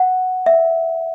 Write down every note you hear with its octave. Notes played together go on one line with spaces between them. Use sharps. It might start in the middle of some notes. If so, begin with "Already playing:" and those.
Already playing: F#5
E5